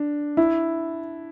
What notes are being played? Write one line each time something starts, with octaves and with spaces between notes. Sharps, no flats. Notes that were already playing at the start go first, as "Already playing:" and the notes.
Already playing: D4
E4